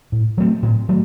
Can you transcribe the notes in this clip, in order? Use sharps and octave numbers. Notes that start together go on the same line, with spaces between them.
A2
F#3 A3 C4
A2
F#3 A3